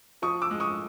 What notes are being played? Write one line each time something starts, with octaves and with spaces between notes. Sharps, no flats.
F3 C#6 D#6
D6 E6
G#3
C#6 D#6